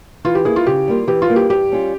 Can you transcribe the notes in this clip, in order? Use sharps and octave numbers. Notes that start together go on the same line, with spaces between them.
E3 F4
G4
A#3 E4 G#4
F4
C#3 G4
G3 A#3 F4
E3 G4
F4
G3 A#3
G4
G2 G4
G3 C#4 F4